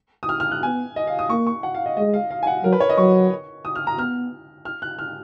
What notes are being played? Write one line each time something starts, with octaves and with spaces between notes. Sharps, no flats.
D#6
F6
F6
F#6
B3 G#5
D#5
F5
D#6
A#3 C#6
C#6
F#5
F5
D#5
G#3 D#5
F5
F5
G#5
F#5
F#3 A#4
B4
C#5
D#5
F#3 C#6
D#6
F6
A#5
B3 F6
F6
F#6
F6